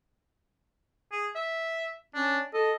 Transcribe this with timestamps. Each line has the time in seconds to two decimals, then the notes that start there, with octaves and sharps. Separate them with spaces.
1.12 G#4
1.35 E5
2.15 C#4 D4
2.54 A4 D#5